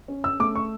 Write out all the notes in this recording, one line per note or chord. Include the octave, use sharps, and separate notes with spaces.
C#4
E6
A3 D6
C#6